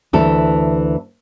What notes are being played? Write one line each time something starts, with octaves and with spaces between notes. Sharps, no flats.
D2 E3 A4